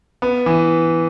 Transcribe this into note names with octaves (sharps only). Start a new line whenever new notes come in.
B3
E3